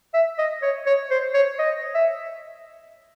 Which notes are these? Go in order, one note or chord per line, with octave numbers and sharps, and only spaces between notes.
E5
D#5
C#5
C#5
C5
C#5
D#5
E5